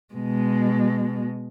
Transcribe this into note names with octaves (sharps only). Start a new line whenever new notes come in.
B2 G#3